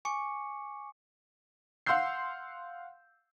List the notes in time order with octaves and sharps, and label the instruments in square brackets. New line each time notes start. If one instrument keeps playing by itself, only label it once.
[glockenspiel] G#5 C#6 D6 C#7
[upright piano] F5 F#5 C6 E6 G6 C7